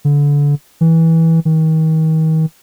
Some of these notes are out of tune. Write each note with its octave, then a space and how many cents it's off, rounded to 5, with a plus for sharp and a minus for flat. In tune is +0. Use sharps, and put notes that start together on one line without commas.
D3 -25
E3 -15
D#3 +35